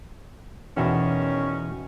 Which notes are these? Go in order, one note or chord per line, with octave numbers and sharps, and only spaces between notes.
E2 B2 D#3 C#4